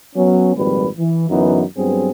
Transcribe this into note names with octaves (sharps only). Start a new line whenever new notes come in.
F#3 B3 C#4
G#1 F2 A#2 G3 B4
E3
F#2 D3 E3 B3 D#4
G2 F#3 B3 C4 G#4